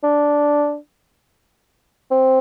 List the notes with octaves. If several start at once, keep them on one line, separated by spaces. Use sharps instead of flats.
D4
C4